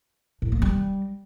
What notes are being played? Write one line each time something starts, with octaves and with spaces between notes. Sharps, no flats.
A2
A#3
G3